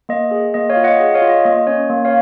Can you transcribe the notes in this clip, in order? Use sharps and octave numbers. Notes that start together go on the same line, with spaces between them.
A#3 D#5
G#4
A#3 D#5
C#5 F5
F4
D#5 F#5
G#4 D#5
C#5 F5
F4
D#5
A#3 D#5
C#4 C#5
A#3
C#5 F5